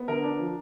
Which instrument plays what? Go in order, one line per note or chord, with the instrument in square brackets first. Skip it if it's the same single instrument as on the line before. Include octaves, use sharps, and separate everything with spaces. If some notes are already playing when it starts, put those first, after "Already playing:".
Already playing: [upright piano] B3
D3 A#4
D4
F3